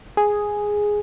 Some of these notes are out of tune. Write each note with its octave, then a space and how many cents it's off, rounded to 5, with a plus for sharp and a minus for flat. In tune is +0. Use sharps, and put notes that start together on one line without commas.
G#4 +0